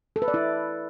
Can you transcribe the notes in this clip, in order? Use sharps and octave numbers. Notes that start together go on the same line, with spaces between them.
A4
B4
D5
E4